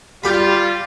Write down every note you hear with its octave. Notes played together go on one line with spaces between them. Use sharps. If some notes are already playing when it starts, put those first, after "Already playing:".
G3 F4 G4 B5